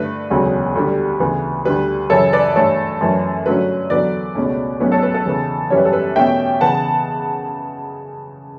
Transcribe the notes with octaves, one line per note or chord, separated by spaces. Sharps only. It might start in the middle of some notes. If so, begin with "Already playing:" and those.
Already playing: G2 D3 A3 B4
E1 D2 C#3 F#3 C#4
D2 D3 G3
D2 C#3 E3 B3
D2 D3 G3 B4
F#2 C#3 E3 A4 C#5
B4 D5
G2 E3 A3 A4 C#5
F#2 E3 A3 C#4
G2 D3 F#3 A3 C#4 B4
E2 D3 F#3 B3 B4 D5
C#2 B2 A3 C#4
B1 B2 A3 C#4 B4
A4 C#5
B4
A4
E2 C#3 E3 B3
F#2 E3 G3 C#4 C#5
B4
A4
B4
E2 B2 A3 C#4 E5 G5
C#3 E3 B3 F#5 A5